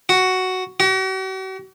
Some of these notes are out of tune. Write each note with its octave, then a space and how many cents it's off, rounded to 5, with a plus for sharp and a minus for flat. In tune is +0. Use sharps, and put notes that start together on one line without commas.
F#4 +5
F#4 +45